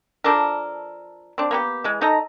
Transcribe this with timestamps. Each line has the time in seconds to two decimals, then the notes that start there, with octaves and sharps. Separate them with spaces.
0.24 F3 D4 A4 A#4
1.38 C4 D4
1.51 A#3 B3 G4
1.84 E3 G#3
2.01 D#4 A4 D#5 A#5